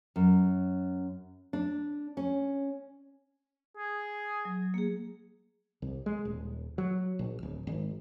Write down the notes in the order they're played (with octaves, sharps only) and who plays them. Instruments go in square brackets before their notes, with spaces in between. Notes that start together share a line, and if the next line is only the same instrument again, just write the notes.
[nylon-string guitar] F#2
D4
C#4
[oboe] G#4
[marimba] F#3
A#3 G#4
[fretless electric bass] C2
G#3
D#1
F#3
A#1
D1
G#1